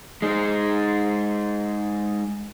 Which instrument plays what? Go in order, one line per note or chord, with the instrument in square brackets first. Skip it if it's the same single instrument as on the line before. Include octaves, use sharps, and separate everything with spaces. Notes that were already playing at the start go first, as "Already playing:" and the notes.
[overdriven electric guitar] G#3 D#4